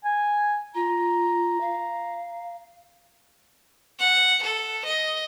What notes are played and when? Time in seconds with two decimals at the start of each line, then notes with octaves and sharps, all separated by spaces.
0.04 G#5
0.75 F4 A#5
1.61 F5
4.00 F#5
4.43 A4
4.85 D#5